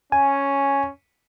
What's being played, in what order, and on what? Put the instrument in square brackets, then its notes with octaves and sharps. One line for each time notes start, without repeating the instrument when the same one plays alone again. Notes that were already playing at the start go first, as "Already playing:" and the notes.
[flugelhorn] C#4 [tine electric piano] G#5